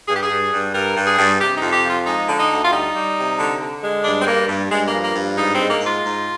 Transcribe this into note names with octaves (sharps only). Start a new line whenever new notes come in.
G2 G#4
G4
G#4
G2
G2
G2 A#4
G2
G#4
G2
C3 G4
D#4
F2
G4
F3
F4
G#3 D#4
D3
D#4
D2
F4
G3 D#4
G3
C3
D3
D3
G#3
G2 D4
C4
G2 A#3
G2
G2 G#3
A#3
F3
A#3
G2
G#2 D#4
G#3 C4
A#3
G#2
F4
G#2